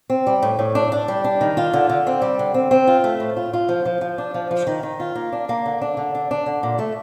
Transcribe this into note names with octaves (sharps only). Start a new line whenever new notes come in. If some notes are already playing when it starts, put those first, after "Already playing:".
C4
G3
A2
A2
D4
D4
G3
D4
D#3
F4
D3
D3
C4
G3
D3
C4
C4
F4
A3
A2
F4
F4
F3
F3
F3
D4
F3
F3
D#3
D#3
F4
A#3
D4
A#3
D3
D4
D3
D4
D4
D3
A#2
A3